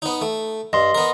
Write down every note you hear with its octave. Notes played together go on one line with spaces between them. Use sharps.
B3 D#4
A3
G2 D#5 C6
B3 A#4